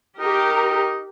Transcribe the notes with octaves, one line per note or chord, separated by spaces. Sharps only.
D#4 G4 A#4